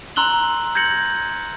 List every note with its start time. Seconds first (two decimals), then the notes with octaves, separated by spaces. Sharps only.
0.16 A#5 C6 E6 F#6 F#7 G7
0.75 G6 G#6 A#6 C#7 F#7